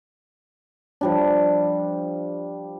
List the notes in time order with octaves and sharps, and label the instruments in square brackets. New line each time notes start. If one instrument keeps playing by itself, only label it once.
[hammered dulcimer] F3 G3 D4